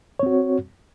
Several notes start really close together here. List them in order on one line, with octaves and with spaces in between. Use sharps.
C#5 C4 F#4